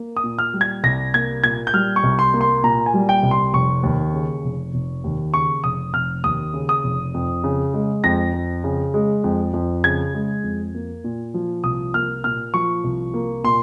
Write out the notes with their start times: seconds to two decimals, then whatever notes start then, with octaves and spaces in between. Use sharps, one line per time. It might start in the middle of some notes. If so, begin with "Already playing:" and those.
Already playing: A#3
0.17 D#6
0.24 A#2
0.39 F6
0.54 G3
0.61 G#6
0.84 C2 A#6
1.14 A#3 G#6
1.44 A#2 G#6
1.67 G6
1.73 G3 F6
1.96 C#6
2.04 C2
2.19 C6
2.34 A#3
2.41 C6
2.64 A#2 A#5
2.86 G#5
2.94 G3
3.09 G5
3.23 C2
3.31 C6
3.53 F1 C#6
3.83 D#2
4.14 C#3
4.44 F1
4.74 F1
5.04 D#2
5.34 C#3 C#6
5.64 F1 D#6
5.94 F1 F6
6.24 D#2 D#6
6.54 C#3
6.69 D#6
6.84 F1
7.14 F2
7.44 C#3
7.74 G#3
8.04 F2 A#6
8.34 F2
8.64 C#3
8.94 G#3
9.24 F2
9.54 F2
9.84 C#3 G#6
10.14 G#3
10.43 F2
10.74 A#3
11.04 A#2
11.34 F3
11.64 C2 D#6
11.94 A#3 F6
12.24 A#2 F6
12.54 F3 C#6
12.84 C2
13.14 A#3
13.44 A#2 C6